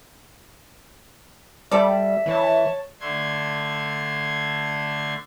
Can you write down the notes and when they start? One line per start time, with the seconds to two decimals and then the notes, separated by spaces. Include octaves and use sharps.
1.71 G3 A4 D5 E5
2.26 E3 C#5 A5
3.00 D3 A3 D4 C6 G#6